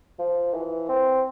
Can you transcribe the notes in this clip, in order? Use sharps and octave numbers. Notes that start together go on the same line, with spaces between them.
F3
E3
C4